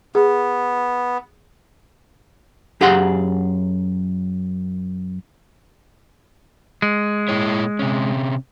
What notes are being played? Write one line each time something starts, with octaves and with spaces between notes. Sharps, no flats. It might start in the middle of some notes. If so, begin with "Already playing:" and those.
B3 G#4
F#2 G4 G#4 F5 F#5 C6
G#3
A#2 E4 C#5
C3 C#4